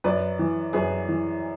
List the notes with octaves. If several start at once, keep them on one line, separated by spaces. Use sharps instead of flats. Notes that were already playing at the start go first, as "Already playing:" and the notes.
F#2 B4 D5
E3
F#2 G#4 B4
E3